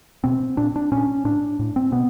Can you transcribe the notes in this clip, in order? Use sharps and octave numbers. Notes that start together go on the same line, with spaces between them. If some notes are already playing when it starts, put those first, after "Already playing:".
B2 C4
A#2 D4
D4
A#2 C#4
A2 D4
A2
C4
B2 B3